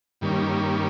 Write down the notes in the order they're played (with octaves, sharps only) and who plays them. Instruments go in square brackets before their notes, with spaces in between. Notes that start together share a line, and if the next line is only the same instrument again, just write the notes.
[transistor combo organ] G2 D#3 G3 A#3 C#4